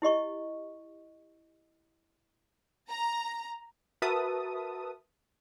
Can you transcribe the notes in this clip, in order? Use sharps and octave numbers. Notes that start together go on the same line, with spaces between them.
E4 G4 D#5 C#6
A#5
F#4 A#4 B4 E5 A5 D#6